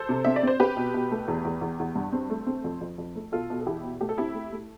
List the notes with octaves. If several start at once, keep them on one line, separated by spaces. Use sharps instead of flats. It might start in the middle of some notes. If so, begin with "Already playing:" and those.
Already playing: A4 C5
C3
C4 E5
D5
C4 C5
C4 G4 B4
B2
B2
A3
E2
E2
E2
E2
G2
C4
A3
C4
F2
F2
F2
A3
B2 F4 A4
B2
A4
E2 E4 G4
B2
A3 G4
A4
C4 E4 G4
A3
A3